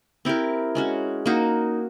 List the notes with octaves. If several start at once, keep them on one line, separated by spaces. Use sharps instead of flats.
C4 E4 G4 A#4
G#3 C#4 F#4
A#3 D#4 F#4